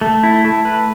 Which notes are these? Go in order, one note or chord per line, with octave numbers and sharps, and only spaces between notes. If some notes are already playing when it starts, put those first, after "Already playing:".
A3
E4
A3
B4